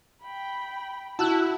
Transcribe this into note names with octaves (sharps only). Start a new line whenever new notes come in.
G5 B5
E4 F#4 A5 E6 F#6